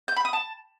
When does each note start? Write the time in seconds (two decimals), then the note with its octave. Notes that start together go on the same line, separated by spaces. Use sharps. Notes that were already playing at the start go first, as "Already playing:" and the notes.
0.08 G6
0.16 B5
0.25 D#6
0.33 A5